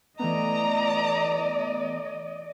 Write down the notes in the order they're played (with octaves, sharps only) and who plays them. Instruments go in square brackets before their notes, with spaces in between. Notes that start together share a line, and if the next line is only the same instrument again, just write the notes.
[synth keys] E3 A3 B3 [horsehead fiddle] D5 D#5 [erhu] A#5